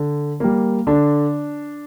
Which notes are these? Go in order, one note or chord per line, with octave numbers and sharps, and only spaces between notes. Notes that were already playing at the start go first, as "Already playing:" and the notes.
Already playing: D3
G3 A#3
D3 D4